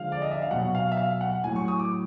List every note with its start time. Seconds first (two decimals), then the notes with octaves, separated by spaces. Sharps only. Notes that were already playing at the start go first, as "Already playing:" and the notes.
Already playing: D3 F3 G#3 F5
0.12 D5
0.22 D#5
0.31 E5
0.42 F5
0.50 B2 F#3 F#5
0.75 F5
0.92 E5
0.97 F5
1.21 F#5
1.44 A2 F#3 G#5
1.56 C#6
1.68 D#6
1.79 D6